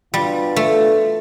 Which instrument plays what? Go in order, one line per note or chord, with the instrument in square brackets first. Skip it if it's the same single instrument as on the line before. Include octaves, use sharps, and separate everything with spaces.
[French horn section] B2 B3 D4 F4 [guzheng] G3
[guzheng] A3